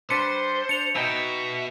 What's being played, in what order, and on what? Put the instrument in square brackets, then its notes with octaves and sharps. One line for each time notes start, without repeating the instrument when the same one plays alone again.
[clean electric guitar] G3 D4 B4 [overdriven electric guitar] C5 [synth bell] C#7
[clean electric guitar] D4 [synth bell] C#7 F7
[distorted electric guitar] B2 [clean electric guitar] D#4 G5 [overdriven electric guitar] E5